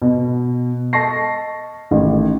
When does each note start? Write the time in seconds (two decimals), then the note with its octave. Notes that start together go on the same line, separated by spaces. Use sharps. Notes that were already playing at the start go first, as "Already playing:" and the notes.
0.02 B2
0.93 D#5 A5 C#6 A#6 C7
1.91 A1 D#3